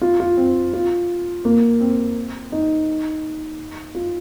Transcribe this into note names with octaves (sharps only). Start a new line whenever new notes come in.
F4
F4
C4
F4
A#3
C4
D#4
F4